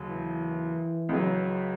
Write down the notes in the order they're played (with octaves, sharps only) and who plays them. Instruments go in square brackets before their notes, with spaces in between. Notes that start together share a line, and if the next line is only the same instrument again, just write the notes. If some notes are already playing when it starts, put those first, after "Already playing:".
Already playing: [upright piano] D#2 C#3 F#3
[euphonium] E3
[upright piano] C#2 C#3 F#3